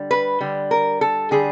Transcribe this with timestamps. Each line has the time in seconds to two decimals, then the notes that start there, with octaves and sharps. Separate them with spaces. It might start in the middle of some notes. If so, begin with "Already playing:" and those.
Already playing: D3 G3
0.11 B4
0.40 D3 G3
0.71 A#4
1.01 A4
1.31 D3 G3 G#4